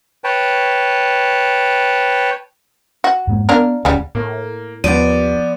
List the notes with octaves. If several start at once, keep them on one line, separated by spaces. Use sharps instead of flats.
B4 C#5 G5 A5
F#4
F2 G#2 A#3
A#3 B3 D4 A#4
D1 D2 C#3 F#3 G3
A2 A#3
D#2 F3 B3 D5 D#7